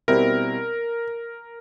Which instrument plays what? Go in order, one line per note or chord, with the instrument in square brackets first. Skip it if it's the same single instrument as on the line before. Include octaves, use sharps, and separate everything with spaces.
[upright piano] B2 G3 C4 E4 [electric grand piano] A#4